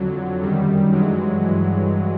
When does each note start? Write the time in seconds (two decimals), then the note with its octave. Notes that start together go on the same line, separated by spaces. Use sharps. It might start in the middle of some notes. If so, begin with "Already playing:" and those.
Already playing: F2 D3 F#3
0.42 F#2 D#3 G3
0.92 G2 E3 F#3 G#3
1.42 G2 E3